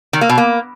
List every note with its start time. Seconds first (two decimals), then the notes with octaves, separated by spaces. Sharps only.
0.13 D#3
0.21 A#3
0.29 B2
0.38 A#3